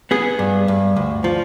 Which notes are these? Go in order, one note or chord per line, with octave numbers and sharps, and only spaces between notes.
B3 G#4
G2
G2
D2
F3